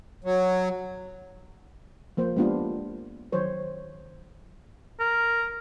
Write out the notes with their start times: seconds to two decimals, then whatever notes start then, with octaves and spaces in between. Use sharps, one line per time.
0.24 F#3
2.17 F3 A#3 C5
2.36 G#3 A#3 B3 D4 F4 G4
3.32 D#3 F#3 C5 C#5
5.00 A#4